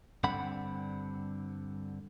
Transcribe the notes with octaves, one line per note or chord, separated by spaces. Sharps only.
G2 D3 C4 F#5 B5